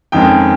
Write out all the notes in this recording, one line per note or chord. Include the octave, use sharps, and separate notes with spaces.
F2 D#3 G#3 C#4 G5